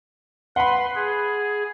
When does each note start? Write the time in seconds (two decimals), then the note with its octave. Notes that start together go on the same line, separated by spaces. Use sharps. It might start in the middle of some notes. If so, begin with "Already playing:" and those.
0.56 B4 F#5 B5 C6
0.95 G#4